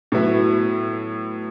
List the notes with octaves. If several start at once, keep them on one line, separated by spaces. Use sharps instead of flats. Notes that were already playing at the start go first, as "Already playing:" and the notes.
A2 F#3 B3 E4